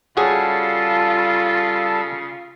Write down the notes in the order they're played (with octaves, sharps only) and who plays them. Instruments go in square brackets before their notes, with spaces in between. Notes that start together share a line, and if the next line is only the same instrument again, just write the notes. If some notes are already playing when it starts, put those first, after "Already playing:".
[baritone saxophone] C#3 [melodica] G3 A4 A5 [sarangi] F4 [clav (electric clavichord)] F#4 G#4 C#5